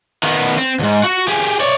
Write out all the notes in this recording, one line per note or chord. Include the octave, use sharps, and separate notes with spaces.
D#3 B3
C4
D2 G#2
F#4 F#5
G4 G#4
C#5 D5